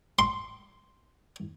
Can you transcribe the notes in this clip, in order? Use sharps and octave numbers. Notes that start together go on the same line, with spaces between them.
C6